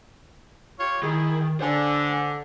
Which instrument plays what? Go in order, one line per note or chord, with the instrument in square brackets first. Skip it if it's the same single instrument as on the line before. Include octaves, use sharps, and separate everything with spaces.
[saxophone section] F4 G4 C#5
[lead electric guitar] D#3 [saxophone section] E4 G#4
[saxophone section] D3 [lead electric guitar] C5 G#5